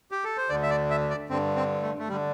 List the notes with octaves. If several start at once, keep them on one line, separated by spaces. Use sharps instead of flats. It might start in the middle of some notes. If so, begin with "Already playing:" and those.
G4
A4
C5
D2 D3 D5
E5
D5
E5
D5
G2 D3 C4
C4
A3
A3
G3
D3